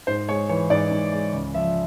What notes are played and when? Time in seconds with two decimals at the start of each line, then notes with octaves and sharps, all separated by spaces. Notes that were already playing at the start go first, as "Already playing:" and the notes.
0.07 G#2 C5
0.29 G#3 C#5
0.49 E3 C#5
0.70 G#2 D5
0.91 G#2
1.13 G#3
1.33 C#2
1.54 F3 E5